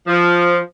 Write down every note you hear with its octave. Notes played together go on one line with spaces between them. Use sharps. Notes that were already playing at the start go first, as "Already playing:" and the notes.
F3